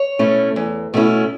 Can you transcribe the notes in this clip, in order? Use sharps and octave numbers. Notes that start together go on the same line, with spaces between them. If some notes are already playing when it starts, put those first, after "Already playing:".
Already playing: C#5
B2 A3 C#4 E4
E2
B2 A3 C#4 E4